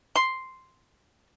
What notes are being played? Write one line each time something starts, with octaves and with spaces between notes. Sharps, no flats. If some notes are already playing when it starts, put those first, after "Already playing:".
C6